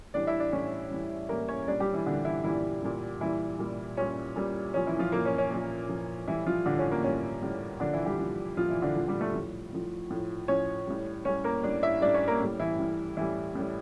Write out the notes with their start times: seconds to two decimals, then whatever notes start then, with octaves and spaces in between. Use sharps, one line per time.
0.14 A2 E3 G3 D4 D5
0.27 E4 E5
0.40 D4 D5
0.52 A2 E3 G3 C#4 C#5
0.91 A2 E3 G3
1.29 A2 E3 G3 A#3 A#4
1.49 C#4 C#5
1.68 A#2 G3 D4 D5
1.80 G3 G4
1.93 E3 E4
2.06 A#2 D3 G3 D4
2.25 E3 E4
2.44 A#2 E3 G3 E4
2.83 A#2 G3
3.21 A#2 E3 G3 E4
3.59 A#2 G3
3.97 A#2 G3 C#4
4.36 A#2 G3
4.74 A#2 F3 C#4
4.87 E3 E4
4.99 F3 F4
5.12 A#2 F3 A#3
5.25 C#4
5.38 C#4
5.51 A#2 F3
5.89 A#2 F3
6.27 A2 E3 G3 E4
6.46 F3 F4
6.66 A2 D3 G3 D4
6.79 C#4
6.92 A#3
7.04 A2 G3 C#4
7.42 A2 G3
7.80 A#2 D3 F3 D4
7.93 E3 E4
8.06 G3 G4
8.19 A#2 F3
8.57 A#2 F3 F4
8.70 E3 E4
8.82 D3 D4
8.95 A#2 F3
9.08 G3 G4
9.21 A3 A4
9.34 A2 F3
9.73 A2 F3
10.10 A2 F3
10.48 A2 F3 C#4 C#5
10.87 A2 G3
11.25 A2 G3 C#4 C#5
11.44 A#3 A#4
11.63 A2 G3 D4 D5
11.83 E4 E5
12.02 A2 G3 D4 D5
12.14 C#4 C#5
12.28 A#3 A#4
12.40 A2 G3
12.60 E3 E4
12.79 A2 G3
13.17 A2 E3 G3 E4
13.55 A2 G3